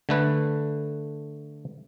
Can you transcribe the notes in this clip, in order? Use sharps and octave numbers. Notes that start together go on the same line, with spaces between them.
D3 A3 B4